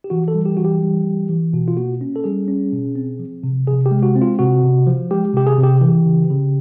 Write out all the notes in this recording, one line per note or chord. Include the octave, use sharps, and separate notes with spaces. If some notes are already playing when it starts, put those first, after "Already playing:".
G4
E3 F#4
A4
G3
G4
E3 F#4
G4
G3
E3
E3
B2 F#4
F4
A#3 F#4
C#4
A4
G3 G#4
C#4
B2
C4
F3
C3
C3 G#4
G4
G#3
F#4
C4
F4
C3 F#4
C3
F3
G#3 G4
C3 G4
G#4
C3
G4
E3 G4
C#3
C#3